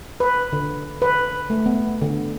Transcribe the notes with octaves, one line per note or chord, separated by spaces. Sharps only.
B4
D3
B4
A3
B3
D3